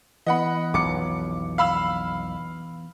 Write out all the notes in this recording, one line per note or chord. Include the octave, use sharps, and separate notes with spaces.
E3 B3 D#5 F#5 B5
B1 F2 D6 C#7
F5 B5 E6